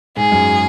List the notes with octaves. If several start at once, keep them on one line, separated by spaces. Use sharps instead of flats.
G#2 G#4
F#2